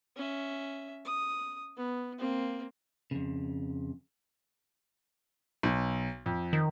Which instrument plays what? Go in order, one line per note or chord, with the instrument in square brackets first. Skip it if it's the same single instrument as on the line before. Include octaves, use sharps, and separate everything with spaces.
[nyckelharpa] C#4 E5
D#6
B3
A#3 C4
[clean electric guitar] F2 C#3
[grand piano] B1
F2
[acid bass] D#3